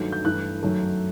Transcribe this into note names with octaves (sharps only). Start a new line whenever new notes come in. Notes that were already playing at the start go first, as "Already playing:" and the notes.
Already playing: G2 D#3 F#3 A3 G6
G6
G2 E3 A3 F#6
F#2 D#3 F#3 A3